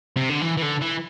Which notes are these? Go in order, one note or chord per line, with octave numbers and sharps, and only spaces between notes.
C3
D3
E3
E3
D3
E3